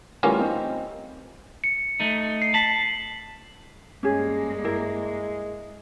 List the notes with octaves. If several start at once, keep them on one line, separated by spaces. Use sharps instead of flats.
E3 G3 A3 A#3 C#4 F4
C4 D#4
C#7
A3 D#4
C7
A5 B6 F#7
G2 G#3 A#3 C#4 G#4
E4 A#4